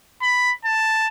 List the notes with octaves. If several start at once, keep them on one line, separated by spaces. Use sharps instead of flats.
B5
A5